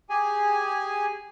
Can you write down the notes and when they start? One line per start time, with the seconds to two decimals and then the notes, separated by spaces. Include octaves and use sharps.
0.10 G4 G#4 G#5